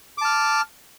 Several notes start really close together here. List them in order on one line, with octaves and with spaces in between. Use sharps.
D6 A5 F6